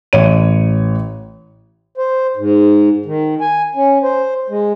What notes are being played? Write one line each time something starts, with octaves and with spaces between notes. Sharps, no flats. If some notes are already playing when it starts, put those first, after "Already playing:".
A1 C#5 D#7
C5
G#2
D#3
G#5
C#4
C5
G#3